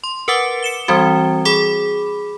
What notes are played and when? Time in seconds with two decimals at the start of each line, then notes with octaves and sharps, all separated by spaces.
0.04 C6
0.28 A#4 B4 F#5 D6 A6
0.63 C#7 E7 G7
0.88 E3 G3 C4 F#4
1.45 G#4 B5 D6